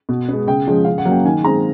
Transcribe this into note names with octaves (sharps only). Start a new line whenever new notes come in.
B2
G#3 B3
C#3 G5
F3 G#3 C#4
C#3 F5
F#5
F#3 A#3 C#4
G5
D#3 G#5
G#3 C4 A#5